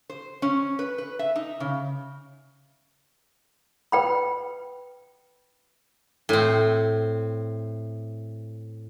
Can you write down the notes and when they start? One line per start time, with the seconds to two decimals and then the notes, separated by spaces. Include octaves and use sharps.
0.10 C5
0.42 C#4
0.79 B4
0.98 B4
1.19 E5
1.36 D#4
1.60 C#3
3.92 B4 G5 B5
6.29 A2 C4